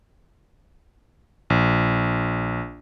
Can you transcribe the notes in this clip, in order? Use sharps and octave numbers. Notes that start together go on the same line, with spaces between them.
A#1